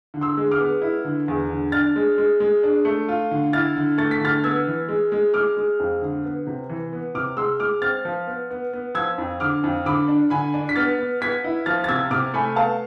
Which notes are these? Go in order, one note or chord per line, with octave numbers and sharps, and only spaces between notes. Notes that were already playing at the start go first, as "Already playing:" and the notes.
D3
C6 E6
G#3
D6 F6
B3
E4
D3
E2
D3
D4 F6 A6
G#3
G#3
G#3
D4
A3
F4
D3
E4 F6 A6
D3
A3 A6
B6
D3 F6 A6
B3 E6 G#6
E3
G#3
G#3
G#3 D6 F6
G#3
F2
D3
B3
C3
E3
B3
C3 D6 F6
G#3 C6 E6
G#3 D6 F6
C4 F6 A6
F3
B3
B3
B3
F3 E6 G#6
F2
D3 D6 F6
F2
D3 B5 D6
D4
D3 G#5 B5
D4
B6
B3 F6 A6
B3
B3 G#6 B6
E4
F3 F6 A6
A6
C3 E6 G#6
C3 D6 F6
A3 G#5 B5
B3 F5 A5